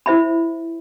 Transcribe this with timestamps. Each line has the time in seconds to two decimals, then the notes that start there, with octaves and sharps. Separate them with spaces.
0.06 E4 C5 E5 B5